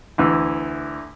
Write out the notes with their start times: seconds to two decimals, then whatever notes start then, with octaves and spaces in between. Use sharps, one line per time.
0.18 D2 E3